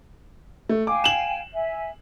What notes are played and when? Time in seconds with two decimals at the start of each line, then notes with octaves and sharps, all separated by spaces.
0.69 A3
0.87 F5 G5 G#5 D6
1.04 E7 F#7
1.54 E5 G#5